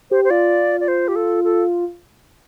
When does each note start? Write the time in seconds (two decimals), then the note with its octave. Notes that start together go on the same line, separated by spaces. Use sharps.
0.11 G4 C5
0.24 C5
0.30 F4 D5
0.80 D5
0.88 C5
1.08 G4
1.16 A4
1.44 A4